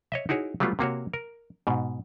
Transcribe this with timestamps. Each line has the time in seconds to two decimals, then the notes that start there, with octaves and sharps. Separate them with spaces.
0.12 C#5 D#5 E5
0.29 D#4 E4 F#4 G#4 C#5
0.60 F#3 G3 A3 B3 F4
0.79 C3 A#3 F#4 C#5
1.14 A#4
1.67 G#2 B2